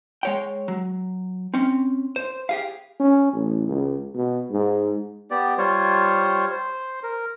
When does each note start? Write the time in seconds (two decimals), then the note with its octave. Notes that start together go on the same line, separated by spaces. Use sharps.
0.23 G#3 C#5 G5
0.68 F#3
1.54 C4 C#4
2.16 C5
2.49 G4 G#4 F5
3.00 C#4
3.33 A1
3.67 C#2
4.14 B2
4.52 G#2
5.31 B3 G4 D5
5.58 G3 F4 C5 C#5
6.52 C5
7.03 A#4